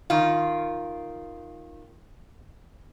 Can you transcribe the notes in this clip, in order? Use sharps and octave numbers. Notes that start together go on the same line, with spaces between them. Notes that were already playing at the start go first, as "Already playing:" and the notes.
D#3 F4